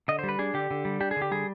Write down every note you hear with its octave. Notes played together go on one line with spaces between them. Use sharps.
D3 D#5
C5
G3
B4
D4 G#4
D3 G4
D3
G3
D4 G4
G#4
D3
G4
G3 G#4